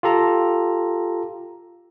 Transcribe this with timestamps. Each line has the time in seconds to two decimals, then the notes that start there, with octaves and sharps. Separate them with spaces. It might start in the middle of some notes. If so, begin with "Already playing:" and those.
0.03 F4 G4 A4 A#5